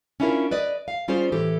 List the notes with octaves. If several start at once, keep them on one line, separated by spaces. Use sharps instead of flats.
C#4 D4 E4 F4 A#4 C#5
B4 D5 D#5
F5
G3 C#4 F4 G#4 C5
A2 E3 G4 A4